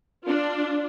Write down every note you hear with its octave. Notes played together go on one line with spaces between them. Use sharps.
D4 F4